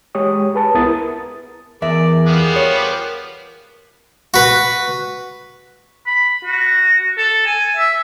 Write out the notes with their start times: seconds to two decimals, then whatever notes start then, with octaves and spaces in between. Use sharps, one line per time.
0.15 G#3 G4 C#5 D#6
0.55 G#4 B4 A5
0.74 C2 B3 E4 A#4 D#6 A6
1.82 E2 G#4 A#4 D5 E5
2.26 F3 G3 B3
2.56 C#5
4.34 F#4 B4
6.07 B5
6.45 F#4
7.18 A4
7.46 G#5
7.77 E5